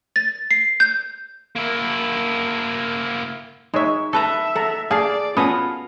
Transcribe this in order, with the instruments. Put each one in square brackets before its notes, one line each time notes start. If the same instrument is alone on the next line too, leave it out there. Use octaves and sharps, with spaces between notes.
[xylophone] A6
C7
G6
[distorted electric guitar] A#3 E4
[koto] G#3 E5 [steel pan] D#4 C#5
[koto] A4 B4 A#5 [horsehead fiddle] E5
[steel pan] A4 A5 A#5 [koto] F#5
[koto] G#4 A5 [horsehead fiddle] D5 [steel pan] F5
[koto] B3 F#4 A4 [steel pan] C#4 G#5 D#6 [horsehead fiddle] F4